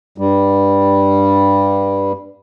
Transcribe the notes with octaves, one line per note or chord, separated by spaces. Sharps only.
G2 G3